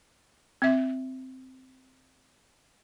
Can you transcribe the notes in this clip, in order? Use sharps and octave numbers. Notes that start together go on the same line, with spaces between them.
C4 E5